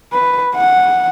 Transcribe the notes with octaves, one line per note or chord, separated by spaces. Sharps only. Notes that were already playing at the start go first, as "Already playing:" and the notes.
B4
F#5